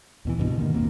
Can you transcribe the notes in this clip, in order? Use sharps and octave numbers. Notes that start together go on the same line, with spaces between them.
D#2 B2 E3
C2 G2 B2
D3 D#3 A#3
F#1 D#2 A#3 C4